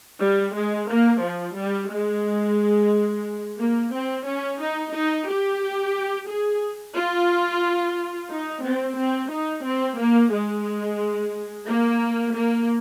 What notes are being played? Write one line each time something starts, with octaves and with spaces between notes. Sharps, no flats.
G3
G#3
A#3
F3
G3
G#3
A#3
C4
C#4
D#4
D#4
G4
G#4
F4
D#4
C4
C4
D#4
C4
A#3
G#3
A#3
A#3